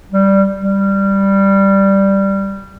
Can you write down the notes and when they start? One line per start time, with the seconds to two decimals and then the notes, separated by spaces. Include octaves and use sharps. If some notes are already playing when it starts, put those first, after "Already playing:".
0.12 G3
0.60 G3